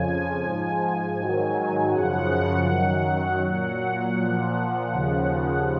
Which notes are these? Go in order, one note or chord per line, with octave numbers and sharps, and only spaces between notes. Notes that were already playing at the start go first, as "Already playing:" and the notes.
Already playing: F2 C#3 F3 G#5
G#2 F3
G#2 D#3 F#3
F#2 C#3 F3 F#5
F#2 D#3 F#3
A#2 F#3 F#5
A#2 F3
D#2 C#3 F3